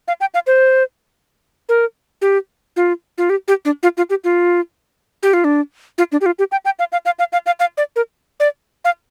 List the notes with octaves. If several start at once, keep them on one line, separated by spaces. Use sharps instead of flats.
F5
G5
F5
C5
A#4
G4
F4
F4
G4
G4
D4
F4
F4
G4
F4
G4
F4
D4
F4
D4
G4
F4
G4
G5
G5
F5
F5
F5
F5
F5
F5
F5
D5
A#4
D5
F5